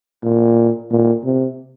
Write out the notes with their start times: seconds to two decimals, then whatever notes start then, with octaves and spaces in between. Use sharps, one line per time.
0.23 A#2
0.91 A#2
1.24 C3